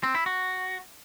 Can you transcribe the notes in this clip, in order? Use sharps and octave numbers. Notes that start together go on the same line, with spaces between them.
C4
E4
F#4